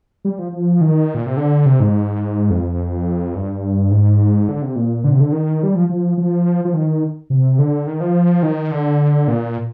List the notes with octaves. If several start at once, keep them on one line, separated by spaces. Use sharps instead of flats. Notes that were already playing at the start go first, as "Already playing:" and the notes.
G3
F3
F3
D#3
A#2
C3
D3
C3
G#2
F2
G2
G#2
D3
C3
A#2
D3
C3
D3
D#3
G3
F3
F3
F3
F3
D#3
C3
D3
D#3
F3
D#3
D3
A#2